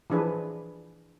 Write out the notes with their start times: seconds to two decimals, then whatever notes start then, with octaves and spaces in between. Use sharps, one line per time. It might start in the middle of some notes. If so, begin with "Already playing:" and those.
0.10 E3 F3 D4 G#4 B4